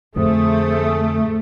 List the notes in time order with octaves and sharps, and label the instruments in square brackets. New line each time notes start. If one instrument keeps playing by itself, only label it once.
[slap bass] F2 A2 D3 [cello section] A3 [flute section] G#4 C5 D#6